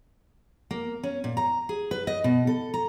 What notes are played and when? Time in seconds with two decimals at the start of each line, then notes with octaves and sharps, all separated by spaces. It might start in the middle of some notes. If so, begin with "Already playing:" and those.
0.71 A#3
1.03 C#4
1.24 A#2
1.37 A#5
1.69 G#4
1.91 B4
2.07 D#5
2.24 B2
2.47 A4
2.74 A#5